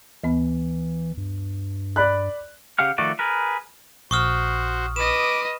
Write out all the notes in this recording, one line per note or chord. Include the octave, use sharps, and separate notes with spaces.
D2 E3 B3 B5
G2
D5 B5 F#6
C#3 G4 F5 F#5 F6
D#3 F3 A3 F#4 D5
G#4 A#4 B4
A#1 F#4 C5 C#6 D#6 F6
B4 D#5 D6 E7